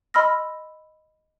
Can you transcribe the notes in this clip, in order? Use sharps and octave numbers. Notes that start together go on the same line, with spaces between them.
D#5 B5 C6 E6 F6 A#6